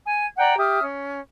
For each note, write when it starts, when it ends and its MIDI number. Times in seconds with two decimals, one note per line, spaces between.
0.06 0.25 80
0.06 0.25 92
0.37 0.56 74
0.37 0.56 78
0.37 0.56 79
0.37 0.56 82
0.58 0.81 67
0.58 0.81 76
0.58 0.81 87
0.58 0.81 89
0.82 1.20 61